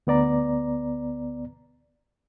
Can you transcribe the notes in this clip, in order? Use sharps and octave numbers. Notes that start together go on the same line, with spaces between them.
D2 B3 D5 A#5